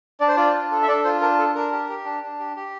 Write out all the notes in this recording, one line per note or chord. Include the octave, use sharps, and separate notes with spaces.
D4 D5
C5
F4 D5
D4
A4
E5
D4 D5
F4 C5
D4 A#4
A4
D4 A#4
G4
G4
D4
D4
G4
G4